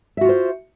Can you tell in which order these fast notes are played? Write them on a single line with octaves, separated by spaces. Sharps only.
E5 F#4 F4 C5